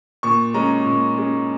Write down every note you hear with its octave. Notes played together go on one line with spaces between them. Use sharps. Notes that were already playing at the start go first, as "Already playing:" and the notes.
A#2 C#6
G#3 C#4 A#5
A#2
G#3 C#4